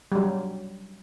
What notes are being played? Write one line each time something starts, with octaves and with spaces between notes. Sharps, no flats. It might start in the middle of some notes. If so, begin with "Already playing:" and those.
F#3 G3